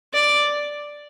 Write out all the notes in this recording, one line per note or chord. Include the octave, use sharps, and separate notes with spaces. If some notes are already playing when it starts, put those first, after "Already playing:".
D5